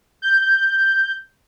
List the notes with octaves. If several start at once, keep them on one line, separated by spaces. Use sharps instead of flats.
G6